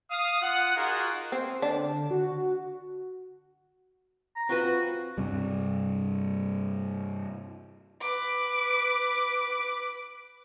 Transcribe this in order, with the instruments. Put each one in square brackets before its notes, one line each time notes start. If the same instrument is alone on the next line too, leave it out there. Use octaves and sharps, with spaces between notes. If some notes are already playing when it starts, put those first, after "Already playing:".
[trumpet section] F5 D#6
F4 F#5
D#4 F4 F#4 G#4 A#4
[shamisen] C4
[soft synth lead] D3 [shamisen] D4
[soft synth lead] F#4
[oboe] A#5
[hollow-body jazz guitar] C4 F4 B4 [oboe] F#4
[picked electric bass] G2 C3 G3
[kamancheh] B4 D6